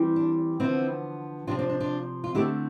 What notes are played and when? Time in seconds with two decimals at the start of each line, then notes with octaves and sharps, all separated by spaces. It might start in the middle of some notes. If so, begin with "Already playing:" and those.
Already playing: E3 G3 C4
0.16 D4
0.60 D3 F3 B3 C4 E4
1.47 C3 F3 C4 D4 F4
1.59 D4 F4
1.70 D4
1.80 D4 F4
2.24 F4
2.35 D3 A3 C4 E4 G4